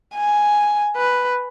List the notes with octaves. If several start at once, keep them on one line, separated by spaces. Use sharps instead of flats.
G#5
B4